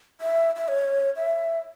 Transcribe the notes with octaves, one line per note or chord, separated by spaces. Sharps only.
E5
E5
C#5
E5